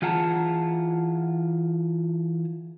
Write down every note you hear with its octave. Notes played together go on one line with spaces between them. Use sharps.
E3 F4 G#4 F#5 A5 A#5